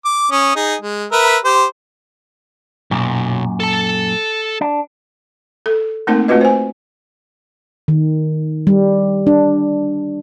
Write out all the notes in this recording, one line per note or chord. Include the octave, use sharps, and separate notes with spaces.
D6
C#4 D#6
D#4 G#4
G#3
A#4 B4 E5
G4 C5
B1 F#2 A#2
A4 A5
D4
A4
A3 A#3 C4 D#4 A#4 F#5
A3 C4 F4 F#4 B4 D#5
C5 G#5
D#3
G3
D4